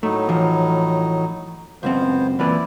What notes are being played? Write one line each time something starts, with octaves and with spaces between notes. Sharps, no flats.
A2 F#3 A3 D#4
E3 F3
C#2 F#2 B3 C4 C5
E2 A#2 E4 B4 D5